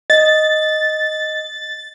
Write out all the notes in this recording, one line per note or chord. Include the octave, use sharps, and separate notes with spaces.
D#5 A6